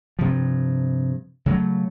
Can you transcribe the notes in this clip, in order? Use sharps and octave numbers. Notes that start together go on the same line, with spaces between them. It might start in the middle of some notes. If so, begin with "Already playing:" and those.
G2 C3 F3
C#3 F#3 G3 A3